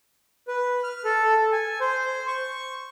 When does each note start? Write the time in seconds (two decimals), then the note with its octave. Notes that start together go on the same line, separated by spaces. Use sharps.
0.48 B4
0.84 F6
1.04 A4
1.52 G#5
1.80 C5
2.27 C#6